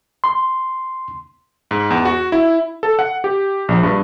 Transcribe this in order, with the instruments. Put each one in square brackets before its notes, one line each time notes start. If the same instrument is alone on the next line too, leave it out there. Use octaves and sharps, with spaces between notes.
[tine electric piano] C6
[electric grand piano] G#2
E2
F#4
E4
A4
F#5
G4
A#1
G2